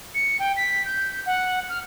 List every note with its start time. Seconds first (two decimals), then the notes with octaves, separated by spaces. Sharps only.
0.15 C#7
0.39 G5
0.57 B6
0.85 G6
1.11 G6
1.26 F#5
1.69 F6